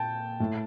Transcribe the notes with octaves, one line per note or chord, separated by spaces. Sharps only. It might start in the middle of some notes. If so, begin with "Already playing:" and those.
Already playing: A#2 G5 A5
A2